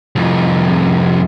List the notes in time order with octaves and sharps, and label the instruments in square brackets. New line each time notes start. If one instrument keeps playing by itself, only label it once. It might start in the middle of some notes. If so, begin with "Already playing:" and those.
[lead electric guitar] C2 F2